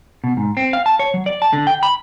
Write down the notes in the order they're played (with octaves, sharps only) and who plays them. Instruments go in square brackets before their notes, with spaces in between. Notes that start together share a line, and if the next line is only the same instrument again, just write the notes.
[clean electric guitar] B2
G#2
C4
F5
A5
C#5
F#3
D5
A5
D3
G5
B5